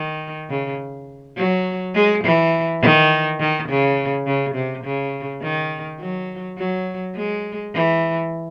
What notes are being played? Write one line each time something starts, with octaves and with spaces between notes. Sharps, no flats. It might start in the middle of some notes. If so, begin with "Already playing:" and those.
Already playing: D#3
C#3
F#3
G#3
E3
D#3
D#3
C#3
C#3
C3
C#3
D#3
F#3
F#3
G#3
E3